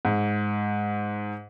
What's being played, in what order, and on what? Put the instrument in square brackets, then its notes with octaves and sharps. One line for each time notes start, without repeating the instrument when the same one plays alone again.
[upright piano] G#2